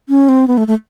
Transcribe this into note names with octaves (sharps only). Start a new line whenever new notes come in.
C#4
C4
B3
A3
A3